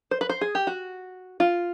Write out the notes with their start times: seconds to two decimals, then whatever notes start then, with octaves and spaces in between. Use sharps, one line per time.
0.11 C5
0.21 B4
0.29 C5
0.41 G#4
0.55 G4
0.67 F#4
1.40 F4